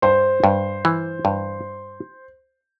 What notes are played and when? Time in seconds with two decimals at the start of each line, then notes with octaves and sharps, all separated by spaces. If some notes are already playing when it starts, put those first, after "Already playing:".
0.02 G2 C5
0.44 G2
0.85 E3
1.25 G2